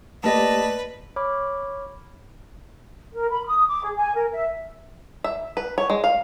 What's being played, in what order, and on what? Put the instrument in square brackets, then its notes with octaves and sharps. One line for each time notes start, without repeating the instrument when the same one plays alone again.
[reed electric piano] A3 A#3 G4 [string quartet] B4 [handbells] D5 D#5 A5
[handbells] C#5 B5 D6 F6
[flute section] A#4
B5
D#6
D6
G#4
G#5
A#4
E5
[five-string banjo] E5
B4
C#5
G#3
F5